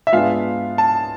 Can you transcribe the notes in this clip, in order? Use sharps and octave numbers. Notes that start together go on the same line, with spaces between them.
E5
G#2 G#3 B3 D4 F4 F5
A5